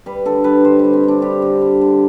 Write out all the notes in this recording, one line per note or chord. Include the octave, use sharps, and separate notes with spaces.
G3 B4
D3 A4
G3 B4
D3 C5
G3 B4
C4
D3 D4
G3 G4
D3
G3
D3